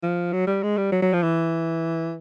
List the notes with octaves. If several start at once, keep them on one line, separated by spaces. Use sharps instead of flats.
F3
F#3
G3
G#3
G3
F#3
F#3
F3
E3